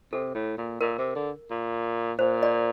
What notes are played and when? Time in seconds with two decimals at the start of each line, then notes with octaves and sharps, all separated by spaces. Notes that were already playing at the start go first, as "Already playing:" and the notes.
0.13 C3 A4
0.35 A2
0.58 A#2
0.81 A#2 A#4
0.98 C3
1.15 D3
1.50 A#2
2.19 A#2 C5
2.43 D5